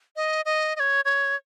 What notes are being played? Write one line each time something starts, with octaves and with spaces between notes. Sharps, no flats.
D#5
D#5
D#5
C#5
C#5